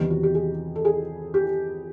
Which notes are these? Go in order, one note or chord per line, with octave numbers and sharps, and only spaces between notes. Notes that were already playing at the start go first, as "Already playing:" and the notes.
Already playing: E2 C3 D#3 G3 B3
F#4
G4
G#4
A4
G#4
G4